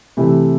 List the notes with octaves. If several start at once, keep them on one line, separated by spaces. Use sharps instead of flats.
C3 E3 A3 E4 G4